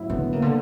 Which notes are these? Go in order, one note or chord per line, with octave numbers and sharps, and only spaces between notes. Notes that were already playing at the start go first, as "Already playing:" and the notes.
Already playing: A2 F#3 E4
D3 B3
C#3 A#3
D3